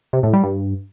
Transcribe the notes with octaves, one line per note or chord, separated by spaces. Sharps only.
C3
A2
G3
G2